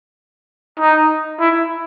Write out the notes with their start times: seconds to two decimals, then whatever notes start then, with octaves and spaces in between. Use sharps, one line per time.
0.79 D#4
1.40 E4